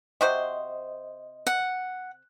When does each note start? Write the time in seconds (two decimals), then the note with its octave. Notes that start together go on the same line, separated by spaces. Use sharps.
0.21 C3 F#4 C5 D#5
1.47 F#5